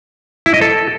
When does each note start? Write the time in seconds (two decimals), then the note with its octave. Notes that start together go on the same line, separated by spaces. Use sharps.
0.46 E4
0.54 D#5
0.61 A4